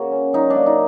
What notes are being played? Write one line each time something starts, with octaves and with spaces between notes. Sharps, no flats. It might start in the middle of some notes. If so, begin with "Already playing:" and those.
Already playing: C#3 A#3 F#4
C#4
F#3 D#4
A#3 D4
D#4